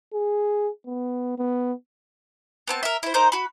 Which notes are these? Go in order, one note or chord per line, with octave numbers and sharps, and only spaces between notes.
G#4
B3
B3
B3 C4 A5
A#4 E5
E4 C5
D#4 A#4 C5 G6
F#4 B5